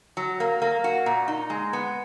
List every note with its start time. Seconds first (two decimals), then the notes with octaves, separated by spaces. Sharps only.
0.17 F#3
0.40 A#3
0.62 A#3
0.84 F#4
1.06 A#2
1.28 D#4
1.50 G#3
1.73 B3